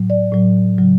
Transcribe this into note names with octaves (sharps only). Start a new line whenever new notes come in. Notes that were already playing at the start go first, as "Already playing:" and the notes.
Already playing: A2 F#3
D5
A2 F#3
C#3 F#3